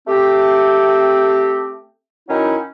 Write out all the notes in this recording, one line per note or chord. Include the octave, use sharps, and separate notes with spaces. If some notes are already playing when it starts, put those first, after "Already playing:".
A3 C4 G4
D#3 F#3 C#4 D#4 E4